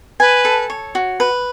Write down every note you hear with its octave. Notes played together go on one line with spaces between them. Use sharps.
B4 G#5
A4
C#5
F#4
B4